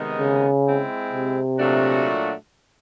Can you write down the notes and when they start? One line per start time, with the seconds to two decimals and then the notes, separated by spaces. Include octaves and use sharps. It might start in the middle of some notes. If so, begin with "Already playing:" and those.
Already playing: C3 D#3 G#3 B3 D#4
0.19 C#3
0.66 G#3 C4 E4
1.13 C3
1.58 A#2 F#3 A3 D4 F#4